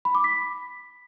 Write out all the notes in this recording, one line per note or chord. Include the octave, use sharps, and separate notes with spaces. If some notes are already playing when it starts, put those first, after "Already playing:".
B5
D6
B6